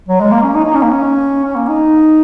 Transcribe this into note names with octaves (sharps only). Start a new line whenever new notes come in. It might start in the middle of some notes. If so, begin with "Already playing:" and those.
F#3
G#3
A#3
C#4
D#4
D#4
C#4
A#3
C#4
C#4
A#3
D#4